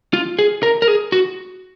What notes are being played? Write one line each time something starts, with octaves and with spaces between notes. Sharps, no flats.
F4
G#4
A#4
A#4
G#4
F#4